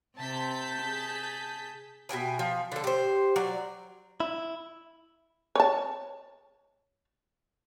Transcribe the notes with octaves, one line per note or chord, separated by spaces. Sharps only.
C3 C4 A5 G6 B6
G#4
B2 E5 G5 G#5
F3
D3 A4
G4 C5
F#3 D5
E4
C#5 A5